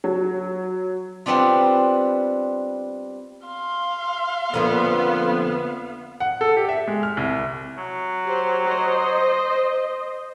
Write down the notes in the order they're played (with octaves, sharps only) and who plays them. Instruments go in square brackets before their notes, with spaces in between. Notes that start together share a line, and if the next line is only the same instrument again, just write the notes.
[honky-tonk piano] F#3
[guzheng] G3 B3 C4 D4 F4
[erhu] F5 [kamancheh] C6
[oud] F2 D3 A#3 [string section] B3
[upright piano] F#5
A4
G4
E5
G#3
F6
C2
[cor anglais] F#3
[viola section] G4 C5
C5 D#5